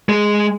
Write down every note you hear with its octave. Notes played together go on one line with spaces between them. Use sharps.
G#3